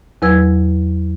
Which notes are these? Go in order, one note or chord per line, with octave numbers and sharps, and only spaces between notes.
E2 F#3 B4 E6 G#6